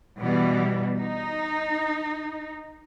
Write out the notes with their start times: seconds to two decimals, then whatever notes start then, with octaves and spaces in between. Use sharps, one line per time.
0.20 B2 E3 G3
1.00 D#4